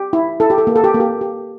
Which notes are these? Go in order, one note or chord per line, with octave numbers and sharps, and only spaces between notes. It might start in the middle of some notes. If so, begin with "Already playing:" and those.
Already playing: G4
E4
E4 A4
G4
A4
A#3
A4
G4
A#3
G4
G4